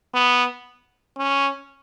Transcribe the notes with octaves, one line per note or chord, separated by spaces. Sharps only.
B3
C#4